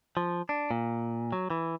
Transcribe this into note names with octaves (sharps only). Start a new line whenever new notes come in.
F3
D4
A#2
F#3
E3